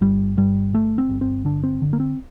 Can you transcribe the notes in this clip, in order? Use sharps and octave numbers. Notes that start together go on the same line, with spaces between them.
G1 G3
G2 G3
G1 A3
C4
G1
C4
D3 D4
C4
D3
A#3
C4